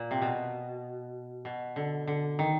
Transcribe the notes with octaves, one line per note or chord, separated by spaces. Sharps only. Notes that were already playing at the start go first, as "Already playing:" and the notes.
Already playing: A#2
C3
B2
B2
D3
D3
D#3